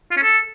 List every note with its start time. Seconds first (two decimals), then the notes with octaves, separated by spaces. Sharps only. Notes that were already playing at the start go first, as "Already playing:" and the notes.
0.11 F4
0.17 C#4
0.22 A4